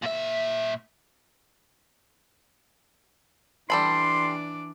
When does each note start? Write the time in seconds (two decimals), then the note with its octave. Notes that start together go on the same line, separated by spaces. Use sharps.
0.03 A#2 E5
3.70 E3 G3 D4 A4 D5 B5 C6